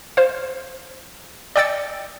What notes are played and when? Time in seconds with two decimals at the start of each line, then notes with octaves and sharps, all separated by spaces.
0.17 C5 F5
1.56 D5 D#5 G5 E6 A6 C#7